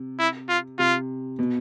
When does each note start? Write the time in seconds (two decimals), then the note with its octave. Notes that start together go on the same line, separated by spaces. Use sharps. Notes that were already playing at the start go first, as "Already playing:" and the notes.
Already playing: C3
0.19 E4
0.49 F4
0.79 C3 F4
1.39 B2